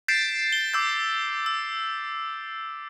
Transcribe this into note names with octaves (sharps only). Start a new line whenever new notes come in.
G6 A6 B6 C7 D7 E7
G7
D6 E6 G6
E6